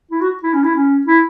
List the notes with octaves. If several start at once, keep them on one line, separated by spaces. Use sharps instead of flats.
E4
F#4
E4
C#4
E4
C#4
E4